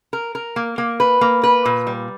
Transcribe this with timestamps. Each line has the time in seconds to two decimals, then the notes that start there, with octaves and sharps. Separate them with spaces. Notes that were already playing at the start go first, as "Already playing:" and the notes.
0.13 A#4
0.35 A#4
0.56 A#3
0.78 A#3
1.00 B4
1.21 A#3
1.43 B4
1.65 A#2
1.87 G3